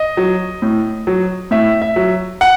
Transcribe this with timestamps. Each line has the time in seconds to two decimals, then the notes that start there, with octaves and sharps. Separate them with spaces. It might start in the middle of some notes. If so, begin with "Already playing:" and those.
Already playing: D#5
0.17 F#3
0.62 A2
1.07 F#3
1.51 A2 E5
1.82 E5
1.96 F#3
2.41 F#5